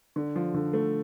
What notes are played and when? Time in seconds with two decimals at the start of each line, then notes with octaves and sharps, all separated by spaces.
0.16 D3
0.36 F3
0.54 D3
0.73 A3